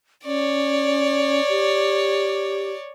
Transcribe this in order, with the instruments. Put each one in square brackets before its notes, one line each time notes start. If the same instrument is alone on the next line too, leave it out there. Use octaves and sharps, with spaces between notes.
[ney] C#4 [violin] C#5 D5
[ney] G4